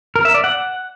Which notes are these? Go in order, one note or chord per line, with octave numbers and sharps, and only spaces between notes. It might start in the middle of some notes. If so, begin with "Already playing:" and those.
A#4
E5
D5
F#5